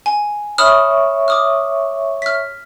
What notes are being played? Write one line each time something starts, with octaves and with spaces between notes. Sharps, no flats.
G#5
C#5 E5 B5 C#6 D#6 F6
D6 D#6 F6
F6 B6